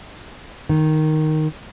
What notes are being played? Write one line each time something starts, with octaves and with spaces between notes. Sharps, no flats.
D#3